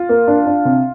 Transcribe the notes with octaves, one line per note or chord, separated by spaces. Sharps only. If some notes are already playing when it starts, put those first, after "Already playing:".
Already playing: F4
A#3
D4
D4
C3